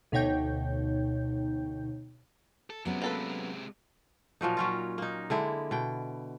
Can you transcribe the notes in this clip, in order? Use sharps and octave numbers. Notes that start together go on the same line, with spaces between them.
D2 B2 D#4 C#5 G5 G6
A4
C3 F#3 G#3 B3 C#4
A#3 A4 B4
A#2 F3 F#3 D#4
F#3 C#4 F4
A#3 D#4
D3 G#3 E4
B2 G5